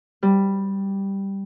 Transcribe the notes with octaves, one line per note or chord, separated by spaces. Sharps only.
G3